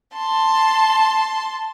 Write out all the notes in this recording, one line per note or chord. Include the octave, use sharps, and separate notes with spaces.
A5 C6